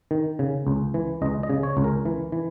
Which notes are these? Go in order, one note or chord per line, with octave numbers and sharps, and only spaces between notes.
D#3
C#3
C#2
E3
C#2 D#5
D#5
C#3
C#5
C#2
A#4
E3
E3